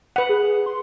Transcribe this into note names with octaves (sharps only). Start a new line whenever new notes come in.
B4 F#5
G#4
C6